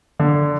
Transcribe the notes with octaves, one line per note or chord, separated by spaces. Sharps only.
D3